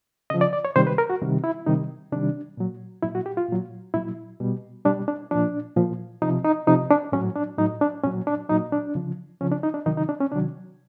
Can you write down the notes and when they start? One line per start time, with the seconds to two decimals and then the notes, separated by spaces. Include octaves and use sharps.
0.30 C#3 F3 D#5
0.41 D5
0.53 D5
0.65 C#5
0.76 C3 D#3 G3 C5
0.87 B4
0.98 A#4
1.10 F#4
1.21 C3 D#3 G3
1.44 E4
1.66 C3 D#3 G3 D#4
2.12 C3 D#3 G3 D4
2.57 A#2 F#3
3.03 A#2 F#3 E4
3.15 F#4
3.26 G4
3.37 F4
3.49 A#2 F#3
3.94 A#2 F#3 E4
4.40 B2 G3
4.85 B2 G3 D4
5.08 D4
5.31 A#2 F3 D4
5.76 A#2 F3
6.22 C3 F3 D#4
6.44 D#4
6.67 C3 F3 D#4
6.91 D4
7.12 A2 F#3 C#4
7.36 D4
7.58 A2 F#3 D#4
7.81 D4
8.04 A#2 F#3 C#4
8.27 D4
8.49 A#2 F#3 D#4
8.72 D4
8.95 C#3 F3
9.41 C#3 F3 C#4
9.51 D4
9.63 D#4
9.74 D4
9.86 C3 D#3 F#3 D#4
9.97 D#4
10.09 D4
10.20 C#4
10.32 C3 D#3 F#3 D4